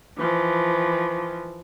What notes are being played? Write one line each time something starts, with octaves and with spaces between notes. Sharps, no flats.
E3 F3